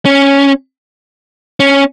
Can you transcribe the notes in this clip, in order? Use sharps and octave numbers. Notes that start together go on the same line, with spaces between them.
C#4
C#4